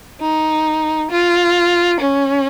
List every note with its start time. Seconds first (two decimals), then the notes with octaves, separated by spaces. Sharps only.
0.20 D#4
1.10 F4
2.00 C#4